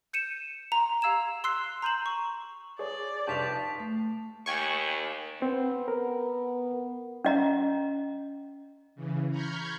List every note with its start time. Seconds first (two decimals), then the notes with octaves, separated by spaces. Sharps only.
0.13 G6 C#7 D#7 E7
0.72 A#5 C6
1.01 G4 F5 E6 G#6 E7 F7
1.44 C6 E6 F#6 C7
1.82 A#5 C6 G6 D#7 E7 F#7
2.06 C#6
2.79 G#4 C#5 D5
3.27 F1 F3 G3 G4 A5 C#6 B6 F7
3.80 A3
4.46 D#2 G5 G#5 C#6
5.42 B3 C4
5.88 A#4
7.25 C#4 D#5 A#5
8.95 C#3 E3
9.30 A#5 B5 C#6 F6 G6 G#6